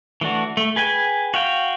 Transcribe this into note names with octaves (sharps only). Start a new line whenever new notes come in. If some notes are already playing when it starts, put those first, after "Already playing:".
E3 A3 D4 F#4
A3
G#4 B4 G5 G#5
F#4 F5 G5